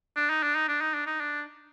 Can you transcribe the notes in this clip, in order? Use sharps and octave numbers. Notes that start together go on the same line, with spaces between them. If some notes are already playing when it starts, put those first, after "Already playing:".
D4
D#4
D4
D#4
D4
D#4
D4
D#4
D4